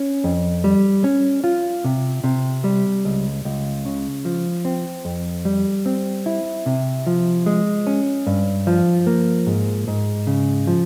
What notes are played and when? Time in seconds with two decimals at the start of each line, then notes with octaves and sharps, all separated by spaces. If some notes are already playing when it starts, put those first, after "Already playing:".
Already playing: C#4
0.24 F2
0.64 G3
1.04 C#4
1.44 F4
1.84 C3
2.24 C3
2.64 G3
3.05 C#2
3.45 C#2
3.85 C#3
4.25 F3
4.65 C4
5.05 F2
5.45 G3
5.86 C4
6.26 E4
6.66 C3
7.07 F3
7.46 G#3
7.87 C#4
8.27 G2
8.67 F3
9.07 A#3
9.47 G#2
9.88 G#2
10.27 C#3
10.67 F3